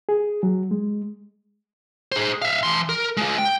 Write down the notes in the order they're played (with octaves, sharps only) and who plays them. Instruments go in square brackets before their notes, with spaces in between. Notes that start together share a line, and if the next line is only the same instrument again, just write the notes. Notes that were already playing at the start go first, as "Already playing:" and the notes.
[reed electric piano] G#4
F#3
G#3
[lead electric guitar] G#4 C5
E5 F5
E3 C6
A#4
G#3 F4
G5